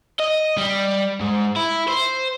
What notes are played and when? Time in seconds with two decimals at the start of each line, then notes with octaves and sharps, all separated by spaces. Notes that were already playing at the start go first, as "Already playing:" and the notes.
0.20 D#5
0.57 G3
1.20 G#2
1.56 E4
1.88 C5